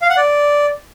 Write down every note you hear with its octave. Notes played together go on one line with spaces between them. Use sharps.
F5
F#5
D5